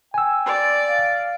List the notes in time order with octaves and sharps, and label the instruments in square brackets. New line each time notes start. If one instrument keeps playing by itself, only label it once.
[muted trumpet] G5 [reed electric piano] G#5 E6
[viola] D5
[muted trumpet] F5